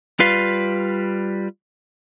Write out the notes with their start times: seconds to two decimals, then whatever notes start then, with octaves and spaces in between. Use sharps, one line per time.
0.20 G3 F4 B4 F5